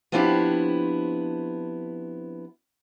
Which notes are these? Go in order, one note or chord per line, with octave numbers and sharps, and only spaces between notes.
F3 B3 C4 D4 E4 G4